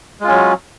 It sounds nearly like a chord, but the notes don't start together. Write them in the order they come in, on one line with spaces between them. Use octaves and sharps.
G#3 F4 C#4 F#3